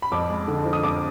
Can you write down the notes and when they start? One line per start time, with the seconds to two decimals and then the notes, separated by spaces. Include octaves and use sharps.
0.02 B5
0.12 F2 D6
0.29 G#3
0.48 D3
0.66 F3
0.73 D#6
0.83 F2 D6